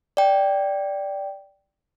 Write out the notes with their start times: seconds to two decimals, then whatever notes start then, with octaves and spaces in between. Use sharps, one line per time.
0.17 D5 G5